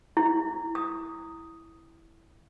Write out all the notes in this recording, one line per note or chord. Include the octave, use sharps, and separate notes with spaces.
E4
D#6